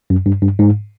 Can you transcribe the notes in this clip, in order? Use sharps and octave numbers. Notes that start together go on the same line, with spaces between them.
F#2
G2
G2
G#2